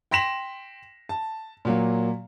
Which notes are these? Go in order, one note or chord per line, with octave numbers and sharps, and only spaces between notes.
G5 C6 A#6 B6 E7 F#7
A5
A#2 F#3 A#3